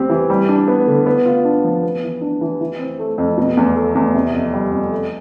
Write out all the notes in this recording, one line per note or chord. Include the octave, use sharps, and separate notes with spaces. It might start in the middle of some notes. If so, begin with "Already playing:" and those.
Already playing: E2 G3 C4 G4
E3
G3
D4
B3
D3
B3
F4
D4
F3
B3
E3
D4
E3
E3
C4
A3
F2
B2
E2
A3
E2
C3
F2
G3
F2
A3